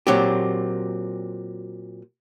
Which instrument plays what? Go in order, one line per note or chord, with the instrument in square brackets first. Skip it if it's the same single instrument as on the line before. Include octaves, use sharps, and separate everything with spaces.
[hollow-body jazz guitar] A#2 F#3 C4 G4